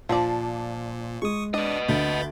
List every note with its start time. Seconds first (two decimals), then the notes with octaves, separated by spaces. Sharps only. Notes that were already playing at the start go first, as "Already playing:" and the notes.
0.09 A#2 F3 D4 F4 D5
1.22 G#3 C#6 D#6
1.54 D4 B4 D5 D#5
1.88 D2 B5 G6 A6